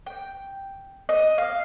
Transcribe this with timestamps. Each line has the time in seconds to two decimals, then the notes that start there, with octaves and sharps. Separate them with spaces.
0.06 G5
1.09 D#5
1.38 F5